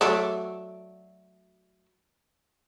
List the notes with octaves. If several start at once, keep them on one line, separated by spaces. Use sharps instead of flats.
F#3 A3 D4